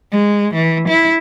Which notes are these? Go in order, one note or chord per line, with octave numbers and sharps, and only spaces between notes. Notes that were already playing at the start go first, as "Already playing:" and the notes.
G#3
E3
E4